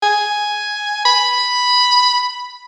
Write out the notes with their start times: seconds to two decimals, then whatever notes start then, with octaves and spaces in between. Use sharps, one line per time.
0.03 G#5
1.06 B5